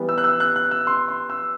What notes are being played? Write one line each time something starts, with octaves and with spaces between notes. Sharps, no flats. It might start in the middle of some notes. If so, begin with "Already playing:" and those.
Already playing: E3 G3 B3
E6
F#6
E6
F#6
F#6
E6
C6
C6
E6